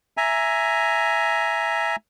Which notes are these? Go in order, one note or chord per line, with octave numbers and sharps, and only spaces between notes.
E5 G#5 A#5